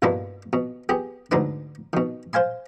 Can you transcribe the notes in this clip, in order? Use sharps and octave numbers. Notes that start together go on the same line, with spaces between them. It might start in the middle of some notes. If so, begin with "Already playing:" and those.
G2 B2 A#3 B3 D4 E4
B2
B3 G4 G#4
D2 G#2 D4 D#4 B4 C6
B2 D#3
C5 F5 G#5 C6